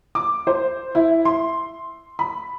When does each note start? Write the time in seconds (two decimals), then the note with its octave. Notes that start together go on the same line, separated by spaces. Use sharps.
0.15 D6
0.47 C5
0.95 E4
1.25 C6
2.19 B5